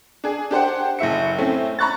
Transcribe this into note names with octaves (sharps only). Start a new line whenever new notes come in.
D4 G#4
D4 G4 C5 F#5
F#1 A2 E5 C#7
A3 C4 C#4 E4
A#5 B5 C#6 F#6 A6